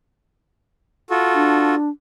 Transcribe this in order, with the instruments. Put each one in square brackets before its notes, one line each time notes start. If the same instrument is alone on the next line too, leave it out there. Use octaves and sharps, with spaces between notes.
[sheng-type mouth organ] F4 F#4 A4
[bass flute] D4